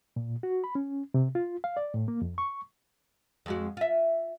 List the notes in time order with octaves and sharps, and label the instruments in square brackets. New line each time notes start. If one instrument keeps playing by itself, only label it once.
[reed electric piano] A#2
F#4
B5
C#4
C3
F4
F5
D5
A2
A#3
F2
C#6
[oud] F2 G#3 F#4
F4 E5